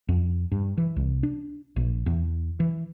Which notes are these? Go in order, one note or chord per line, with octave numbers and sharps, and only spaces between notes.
F2
G2
E3
C2
D4
A#1
E2
E3